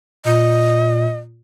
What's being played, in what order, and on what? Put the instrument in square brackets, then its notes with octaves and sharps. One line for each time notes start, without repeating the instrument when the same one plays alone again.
[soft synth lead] A#2 [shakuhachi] D#5